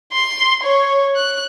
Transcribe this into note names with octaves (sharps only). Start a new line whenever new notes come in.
C6
C#5
F#6